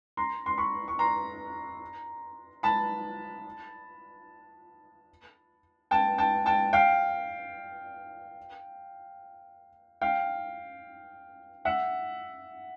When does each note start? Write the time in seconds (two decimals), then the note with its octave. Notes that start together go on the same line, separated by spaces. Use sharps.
0.17 A#5 C6
0.46 C6
0.58 B5 C#6
0.88 C#6
0.99 A#5 C6
2.63 A5 B5
5.91 G5 A5
6.18 G5 A5
6.46 G5 A5
6.73 F5 G5
10.01 F5 G5
11.65 E5 F#5